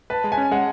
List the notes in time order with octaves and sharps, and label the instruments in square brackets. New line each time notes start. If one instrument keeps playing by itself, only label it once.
[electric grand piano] B4 [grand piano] A5
[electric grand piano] G#3
[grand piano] G#5
[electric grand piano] C#4
[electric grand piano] G#3 [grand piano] F#5